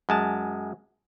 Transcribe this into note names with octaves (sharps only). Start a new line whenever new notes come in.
F#2 G#3 A5